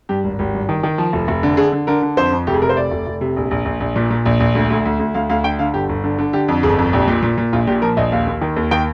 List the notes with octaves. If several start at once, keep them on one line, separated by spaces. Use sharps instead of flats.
G2 G4
G#1
G#1 G4
G2
D#3
D#3
F3
F1
F1
D3
D3 G#4
D3
D3 A#4
D3
F2 C5
F2
F1 G4
G#4
C3 A#4
C5
F1 D5
F1
F1
C3
A#1
A#1
A#1
A#1
A#2
A#2
A#1
A#1
D2
D2
D2
D2
D2 F5
D2 F5
D3 G5
D3 F5
G1 G4
G1
D3
D3
D3 G4
F2
G1 G#4
F2
A#1 G4
A#2
A#2
A#2
A#1 F4
A#2 G4
F3 A#4
A#1 D#5
D#2 F5
D#2
D#3
D#2
D#3 G5